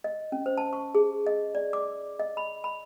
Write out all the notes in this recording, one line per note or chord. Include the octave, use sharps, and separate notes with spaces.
D#5
C#4
C5
A5
C#6
G#4
D#5
D5
D6
D#5
B5
B5